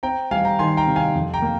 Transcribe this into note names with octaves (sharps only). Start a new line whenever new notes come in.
C4 G5 A#5
G3 F5 G#5
G5 A#5
D#3 G#5 C6
G5 A#5
C3
F5 G#5
F2
G5 A#5
A#3